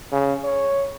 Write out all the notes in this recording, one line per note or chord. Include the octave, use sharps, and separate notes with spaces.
C#3
C#5